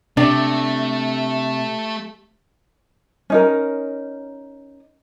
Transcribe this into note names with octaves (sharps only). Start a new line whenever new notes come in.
C3 A3 D4 D5
C#4 D#4 A#4